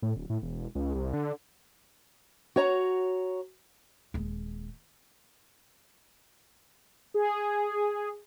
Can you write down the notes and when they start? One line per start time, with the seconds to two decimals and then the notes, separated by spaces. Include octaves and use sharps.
0.02 A2
0.16 D1
0.30 A2
0.42 E1
0.75 C#2
0.95 C2
1.13 D3
2.56 F#4 C#5 A#5
4.14 D#1 G#3
7.14 G#4